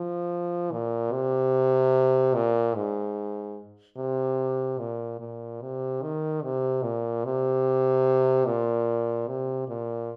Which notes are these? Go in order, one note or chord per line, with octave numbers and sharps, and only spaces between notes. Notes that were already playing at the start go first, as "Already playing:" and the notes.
Already playing: F3
A#2
C3
A#2
G#2
C3
A#2
A#2
C3
D#3
C3
A#2
C3
A#2
C3
A#2